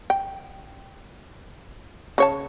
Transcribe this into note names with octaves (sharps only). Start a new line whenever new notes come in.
G5
C#3 C#5 A5